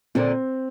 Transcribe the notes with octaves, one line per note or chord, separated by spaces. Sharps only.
A#2 D3 C4